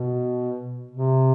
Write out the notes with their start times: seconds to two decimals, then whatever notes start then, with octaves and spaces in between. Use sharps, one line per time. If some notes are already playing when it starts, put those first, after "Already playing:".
Already playing: B2
0.91 C3